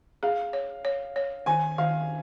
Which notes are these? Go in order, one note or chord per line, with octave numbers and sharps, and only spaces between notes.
G#4 F5
C#5
C#5
C#5
D#3 G#5
D#3 F5